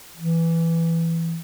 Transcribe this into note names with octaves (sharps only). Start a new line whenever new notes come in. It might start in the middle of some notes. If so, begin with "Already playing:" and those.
E3